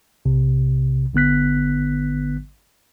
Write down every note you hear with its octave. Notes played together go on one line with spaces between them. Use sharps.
B1 C3
G#1 D3 B3 F#6 B6